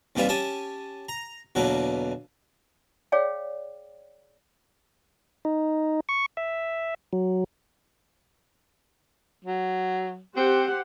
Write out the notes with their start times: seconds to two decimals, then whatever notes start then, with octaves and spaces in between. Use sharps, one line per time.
0.16 D#2 C3 E3 G3 F4 E5
0.29 C#4 G4 G#5 A5
1.09 A#5
1.55 E2 B2 D3 F#3 A#3
3.12 G#4 C#5 D5 F5 G5
5.45 D#4
6.09 C#6
6.37 E5
7.13 F#3
9.45 F#3
10.36 C4 G4 C5 F#5